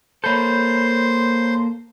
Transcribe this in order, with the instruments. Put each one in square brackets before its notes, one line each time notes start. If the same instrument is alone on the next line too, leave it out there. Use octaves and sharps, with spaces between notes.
[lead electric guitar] A#3 A4 [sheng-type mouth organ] C5 [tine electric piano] C#5 B5 G6